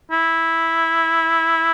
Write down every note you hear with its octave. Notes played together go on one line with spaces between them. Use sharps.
E4